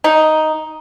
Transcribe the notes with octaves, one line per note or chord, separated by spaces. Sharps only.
D#4